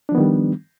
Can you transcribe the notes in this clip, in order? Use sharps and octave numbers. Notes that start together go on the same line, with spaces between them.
D#3 F3 G3 B3 D4